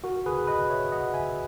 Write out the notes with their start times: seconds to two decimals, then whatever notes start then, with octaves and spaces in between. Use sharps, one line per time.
0.04 F#4 A#4
0.26 G#4 B4
0.47 B4 D#5
0.70 C#5 E5
0.92 D#5 F#5
1.14 E5 G#5